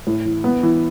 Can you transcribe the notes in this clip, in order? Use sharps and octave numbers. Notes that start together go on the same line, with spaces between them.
A2
E3
B3
E3